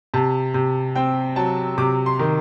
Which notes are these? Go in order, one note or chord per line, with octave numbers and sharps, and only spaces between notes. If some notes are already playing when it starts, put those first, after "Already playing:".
C3 A5
C3
C4 G5
F#3 A5
C3 D6
C6
D#3